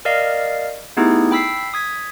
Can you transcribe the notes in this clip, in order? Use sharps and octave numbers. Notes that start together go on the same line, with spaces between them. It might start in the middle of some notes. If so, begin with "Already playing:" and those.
A#4 D5 D#5 F5
A3 B3 D#4 E4 G4 G#4
G5 B5 E6 B6 C7
D#6 G#6 B6